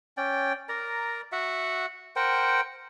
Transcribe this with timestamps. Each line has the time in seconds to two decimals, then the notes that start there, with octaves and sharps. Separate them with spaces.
0.17 C#4 D5 G5
0.69 A#4 D5 A#5
1.32 F#4 E5 F#5
2.16 A#4 C5 F#5 G5